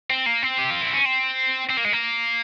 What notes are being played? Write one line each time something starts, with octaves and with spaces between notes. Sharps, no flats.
C4
A#3
C4
G4
F4
E4
C#4
C4
C4
A#3
G#3
A#3